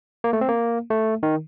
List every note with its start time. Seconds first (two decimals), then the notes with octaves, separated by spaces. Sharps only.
0.24 A#3
0.33 A3
0.41 C4
0.49 A#3
0.90 A3
1.23 D#3